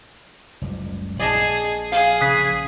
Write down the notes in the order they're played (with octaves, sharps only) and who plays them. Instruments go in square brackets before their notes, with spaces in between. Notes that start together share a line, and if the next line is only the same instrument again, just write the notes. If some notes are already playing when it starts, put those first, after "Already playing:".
[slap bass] F#1 C#2 G3
[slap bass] A#1 [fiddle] G#4 [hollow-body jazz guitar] D5 D#5 A5
[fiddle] G#4 [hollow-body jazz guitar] F5
[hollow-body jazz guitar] C#3 [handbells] D#6 F#6 B6